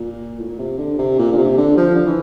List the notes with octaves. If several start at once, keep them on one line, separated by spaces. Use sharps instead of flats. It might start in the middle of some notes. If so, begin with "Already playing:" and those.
Already playing: A#2
A2
A#2
C3
D3
C3
A#2
D3
C3
D3
F3
D3
E3